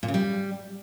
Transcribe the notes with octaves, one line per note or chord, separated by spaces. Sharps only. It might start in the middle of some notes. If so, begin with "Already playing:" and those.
A#2
C#3
G3